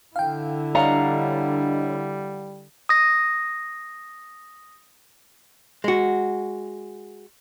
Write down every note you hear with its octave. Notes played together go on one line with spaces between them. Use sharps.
D3 E4 F5 G5
G3 D4 C#5 D#5 F5 F#5 A#5
D#6 A#6
G#3 F#4